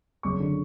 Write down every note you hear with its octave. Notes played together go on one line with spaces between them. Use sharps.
F#1 C#6
D3